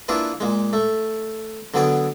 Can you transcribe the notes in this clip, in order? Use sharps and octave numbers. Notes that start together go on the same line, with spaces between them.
A#3 D4 E4 F4 G#4 B4
A#2 G#3
A3
D3 F#3 B3 G#4 D5